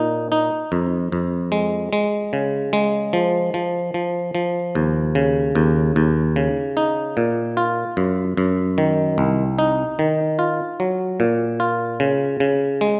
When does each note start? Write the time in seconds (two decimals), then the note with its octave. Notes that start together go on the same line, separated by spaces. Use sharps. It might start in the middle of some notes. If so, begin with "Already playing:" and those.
Already playing: A#2 D#4
0.32 D#4
0.72 F2
1.12 F2
1.52 G#3
1.93 G#3
2.33 C#3
2.73 G#3
3.13 F3
3.54 F3
3.94 F3
4.35 F3
4.75 D#2
5.15 C#3
5.55 D#2
5.96 D#2
6.36 C#3
6.77 D#4
7.17 A#2
7.57 F4
7.97 F#2
8.37 F#2
8.78 D#3
9.18 C2
9.59 D#4
9.99 D#3
10.39 F4
10.80 F#3
11.20 A#2
11.60 F4
12.00 C#3
12.40 C#3
12.81 G#3